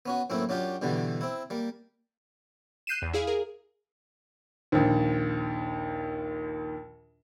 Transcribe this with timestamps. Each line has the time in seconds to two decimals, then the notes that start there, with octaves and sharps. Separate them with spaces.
0.06 B3 C#4 F#4
0.30 F#2 A2 A#3 C4 E4
0.49 F#2 F#3 D4 F4 G4
0.82 G2 B2 D3 E3 G3
1.21 C4 E4
1.50 G3 A#3
2.87 F#6 G6 C7 D#7 E7
3.02 E2
3.13 E4 G#4 F5
3.27 G#4 A#4
4.72 A#1 D#2